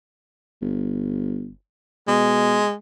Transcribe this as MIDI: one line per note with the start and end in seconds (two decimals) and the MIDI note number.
0.62 1.51 31
2.08 2.64 47
2.08 2.74 56